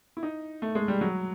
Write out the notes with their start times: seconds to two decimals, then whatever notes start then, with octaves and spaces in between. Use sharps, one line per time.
0.17 E4
0.23 D#4
0.62 A3
0.75 G#3
0.88 G3
1.01 F#3